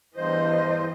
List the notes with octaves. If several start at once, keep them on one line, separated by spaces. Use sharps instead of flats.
E2 G2 E3 C5 D#5